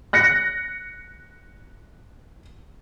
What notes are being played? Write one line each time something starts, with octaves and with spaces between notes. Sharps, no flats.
F#6 A#6 C#7